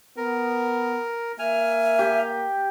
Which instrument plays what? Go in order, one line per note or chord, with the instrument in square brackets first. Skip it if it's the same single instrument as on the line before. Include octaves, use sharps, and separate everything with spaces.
[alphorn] B3 [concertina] A#4
[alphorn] A#3 [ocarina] E5 [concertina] G#5 F6
[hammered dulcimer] G4